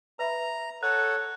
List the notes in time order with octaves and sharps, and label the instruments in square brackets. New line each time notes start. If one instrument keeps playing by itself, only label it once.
[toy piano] B4 E5 B5 [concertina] A#5
[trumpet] A4 [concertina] C#5 F#5 [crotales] F#6